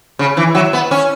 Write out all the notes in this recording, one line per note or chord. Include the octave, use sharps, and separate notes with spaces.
C#3
E3
F#3
B3
C#4